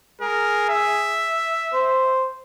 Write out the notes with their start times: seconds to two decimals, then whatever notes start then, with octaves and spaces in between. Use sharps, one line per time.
0.21 G#4 A#4
0.69 E5
1.73 C5